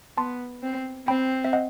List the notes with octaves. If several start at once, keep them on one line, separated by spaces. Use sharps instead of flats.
B3 A5 C6
C4
C4 G5 B5
E5
D#5 F#5